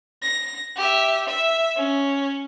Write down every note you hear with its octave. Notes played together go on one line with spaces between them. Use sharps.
A#6
G4 E5
E5
C#4